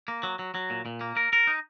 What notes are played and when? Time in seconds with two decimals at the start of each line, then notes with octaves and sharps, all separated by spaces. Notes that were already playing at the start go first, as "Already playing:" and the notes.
0.08 A#3
0.23 F#3
0.39 F#3
0.55 F#3
0.70 A#2
0.86 A#2
1.01 A#3
1.17 A#4
1.33 A#4
1.47 D#4